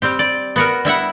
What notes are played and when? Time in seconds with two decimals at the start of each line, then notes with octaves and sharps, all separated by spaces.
0.02 G3 C4 G4
0.19 D5
0.56 B3 F#4 A#4
0.85 G3 E4 E5 F#5